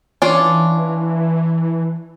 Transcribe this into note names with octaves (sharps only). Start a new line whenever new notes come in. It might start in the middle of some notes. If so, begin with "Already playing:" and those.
E3 C#4 D4 F4